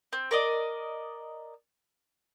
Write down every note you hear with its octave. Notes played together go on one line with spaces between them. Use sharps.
C4
A#4 D5 D#5